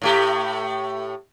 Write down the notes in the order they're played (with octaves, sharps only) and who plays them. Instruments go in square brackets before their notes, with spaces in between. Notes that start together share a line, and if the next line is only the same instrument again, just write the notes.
[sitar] A2 A3 G4